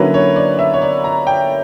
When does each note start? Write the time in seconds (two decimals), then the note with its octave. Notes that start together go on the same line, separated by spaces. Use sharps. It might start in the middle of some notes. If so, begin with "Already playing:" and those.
Already playing: D3 F#3 A#3 C#4 E4 B4
0.14 C#5
0.36 D5
0.59 E5
0.74 C#5
0.82 D5
1.04 A#5
1.27 G5